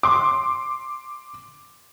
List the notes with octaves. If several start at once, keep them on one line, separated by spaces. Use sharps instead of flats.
C6 D6